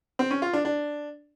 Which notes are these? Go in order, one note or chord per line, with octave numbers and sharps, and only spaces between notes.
C4
C#4
F4
D4
D4